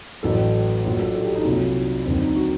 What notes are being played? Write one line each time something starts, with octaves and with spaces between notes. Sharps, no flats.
A1 A2 F#3 A4
A#1 A#2 F#3
A4
A4
G4
D#4
C2 A#2 F#3
D#2 D3 F#3 C4
D#4
F#4